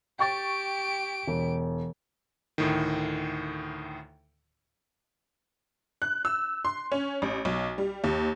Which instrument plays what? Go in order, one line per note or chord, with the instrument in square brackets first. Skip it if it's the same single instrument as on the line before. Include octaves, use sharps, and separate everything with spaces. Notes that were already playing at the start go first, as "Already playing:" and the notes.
[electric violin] G4 D7 [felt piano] G5 C#6 A6
[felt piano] E1
[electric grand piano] D2 A2 D#3
[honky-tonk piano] F#6
E6
C6
C#4
A1
B1
G3
D#2